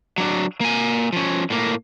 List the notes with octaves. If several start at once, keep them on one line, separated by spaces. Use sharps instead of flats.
F#3 D4
A#3 G#5
F3 C#4
A2 A#3